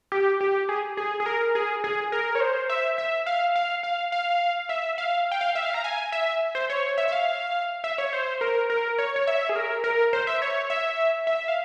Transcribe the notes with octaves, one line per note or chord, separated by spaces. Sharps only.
G4
G4
G#4
G#4
G#4
A#4
G#4
G#4
A#4
C#5
C5
E5
E5
F5
F5
F5
F5
E5
F5
G5
F5
E5
F5
A#5
G#5
E5
C5
C#5
E5
E5
F5
E5
C#5
C5
A#4
A#4
C#5
C#5
E5
G#4
A#4
A#4
C5
E5
C#5
E5
E5
F5